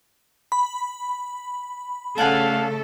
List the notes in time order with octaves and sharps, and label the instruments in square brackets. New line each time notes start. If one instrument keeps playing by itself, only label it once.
[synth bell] B5
[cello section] C#3 A3 A4 [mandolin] D4 F#5 G#5 [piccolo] F5